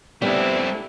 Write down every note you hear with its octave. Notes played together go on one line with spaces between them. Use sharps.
G3 A3 B3 C4 D4 E4 G4